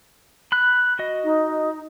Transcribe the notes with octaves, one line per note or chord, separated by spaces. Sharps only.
B5 F#6
F#4 D#5
D#4